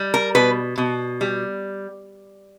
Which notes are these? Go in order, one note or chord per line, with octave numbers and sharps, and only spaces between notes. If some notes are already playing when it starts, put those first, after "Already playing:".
Already playing: G3
A#4
B2 B4
B2
G3